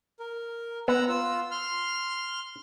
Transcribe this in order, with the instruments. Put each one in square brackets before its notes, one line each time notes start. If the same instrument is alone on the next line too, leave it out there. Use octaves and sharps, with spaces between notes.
[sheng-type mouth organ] A#4
[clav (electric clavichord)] B3 [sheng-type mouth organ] F#5 A#5 E6
[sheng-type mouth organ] F4 E6
C6 F6